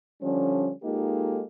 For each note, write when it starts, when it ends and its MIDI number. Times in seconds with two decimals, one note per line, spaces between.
0.22 0.72 50
0.22 0.72 53
0.22 0.72 55
0.22 0.72 61
0.83 1.42 56
0.83 1.42 58
0.83 1.42 63
0.83 1.42 65
0.83 1.42 67
0.83 1.42 69